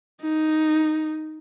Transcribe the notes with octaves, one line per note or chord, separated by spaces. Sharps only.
D#4